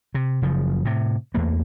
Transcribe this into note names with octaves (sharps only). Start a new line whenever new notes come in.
C3
F#1 C#3 F3
A2 C3
E2 A3 A#3